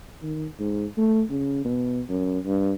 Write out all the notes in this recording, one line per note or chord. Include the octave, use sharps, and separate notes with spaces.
D#3
G#2
A3
C#3
B2
F#2
G2